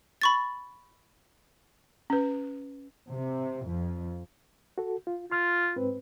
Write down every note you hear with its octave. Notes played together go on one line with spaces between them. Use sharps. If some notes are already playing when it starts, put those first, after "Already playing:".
B5 C#6 A6
C#4 B4
C3
F2
F#4 A4
F4
F4 C6 F6
G#2 C4 B4